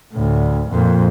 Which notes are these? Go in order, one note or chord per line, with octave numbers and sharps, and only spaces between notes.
D2 A2
F2 A#2